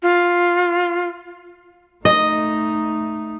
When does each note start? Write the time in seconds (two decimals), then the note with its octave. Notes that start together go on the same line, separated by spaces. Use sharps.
0.02 F4
2.05 A3 D#4 D#5